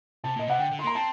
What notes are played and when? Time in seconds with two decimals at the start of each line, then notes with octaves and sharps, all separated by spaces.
0.24 C3 A5
0.36 A#2 D#5
0.48 C3 F#5
0.59 D3 G5
0.72 D3
0.79 C6
0.84 A#3 A#5
0.95 C4 A5